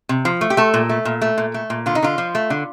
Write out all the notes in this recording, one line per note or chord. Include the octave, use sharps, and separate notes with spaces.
C3
F3
A3
G4
A3 A4
A#2
A3
A#2
A3
A#2
A3
A#2
D3 F4
D#4
D3 F4
F3
A3
D3